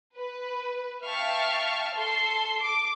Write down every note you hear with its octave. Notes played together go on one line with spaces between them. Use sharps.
B4
E5 F5 G5 A5 C#6 F6
A4 C6 C7
D6